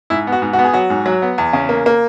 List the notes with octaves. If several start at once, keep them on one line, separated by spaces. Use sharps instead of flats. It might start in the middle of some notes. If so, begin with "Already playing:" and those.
G#2 E4
B3
F#4
G#2
F#4
B3
G#4
F#3 F#4
G#2
F#3
B3
E2
C#3
A#3
A#3